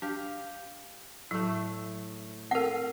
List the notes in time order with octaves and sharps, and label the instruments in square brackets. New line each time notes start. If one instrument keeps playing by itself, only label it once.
[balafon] D4 [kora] G4 F5
[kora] A2 A3 [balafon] F#3
[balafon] C4 A4 [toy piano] A#4 F#5